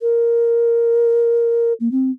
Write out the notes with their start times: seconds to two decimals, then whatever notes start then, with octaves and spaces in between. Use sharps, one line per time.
0.02 A#4
1.80 A#3
1.92 C4